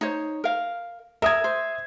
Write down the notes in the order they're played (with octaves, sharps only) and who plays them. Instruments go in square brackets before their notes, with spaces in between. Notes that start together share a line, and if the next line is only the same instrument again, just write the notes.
[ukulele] D#4 C5 C#5
A#4 F5
[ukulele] A#4 [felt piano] E5 D#6 G#6
[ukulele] C5